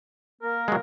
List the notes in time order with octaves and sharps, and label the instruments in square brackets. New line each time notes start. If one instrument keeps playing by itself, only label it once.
[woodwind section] A#3 A#4
[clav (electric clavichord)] F#3 G#3